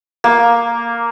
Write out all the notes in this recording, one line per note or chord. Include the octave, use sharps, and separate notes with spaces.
A#3